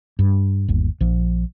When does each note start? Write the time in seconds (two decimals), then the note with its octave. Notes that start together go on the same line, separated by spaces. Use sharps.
0.19 G2
0.68 G1 D#2
1.00 A#1 F3